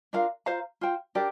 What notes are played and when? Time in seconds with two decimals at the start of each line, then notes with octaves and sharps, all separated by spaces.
0.13 D4 F4 A#4 F5
0.46 F4 C5 F5 A#5
0.81 F4 C5 G5
1.15 D4 G4 A#4 D5